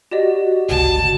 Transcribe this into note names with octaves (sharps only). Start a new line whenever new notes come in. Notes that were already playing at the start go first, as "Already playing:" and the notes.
F#4 G4 D5 D#5
G1 C#2 A5